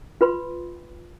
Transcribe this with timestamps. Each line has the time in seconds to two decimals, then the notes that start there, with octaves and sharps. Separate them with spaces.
0.21 F4 B4 B5 C6